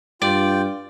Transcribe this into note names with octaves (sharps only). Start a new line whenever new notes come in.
G2 F4 D5 G5